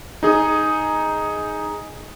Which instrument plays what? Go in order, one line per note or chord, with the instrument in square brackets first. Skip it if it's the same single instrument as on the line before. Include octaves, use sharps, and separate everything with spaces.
[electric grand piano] D#4 G#4 D#6